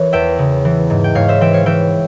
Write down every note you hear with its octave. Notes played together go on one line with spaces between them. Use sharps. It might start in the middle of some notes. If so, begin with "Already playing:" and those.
Already playing: E3 A#4 C#5
E2 E5 G5
C#3
E3
G#2
G5
G#2 C#5 F5
C5 E5
E3 E5 G5
C#5 F5
E3 E5 G5